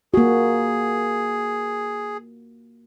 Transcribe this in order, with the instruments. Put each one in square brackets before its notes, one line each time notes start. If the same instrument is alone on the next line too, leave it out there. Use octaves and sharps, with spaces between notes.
[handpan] A#3 F#4 [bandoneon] G#4